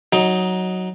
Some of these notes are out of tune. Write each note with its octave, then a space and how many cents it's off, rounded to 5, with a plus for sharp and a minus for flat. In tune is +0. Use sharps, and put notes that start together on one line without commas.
F#3 +0 D#4 +10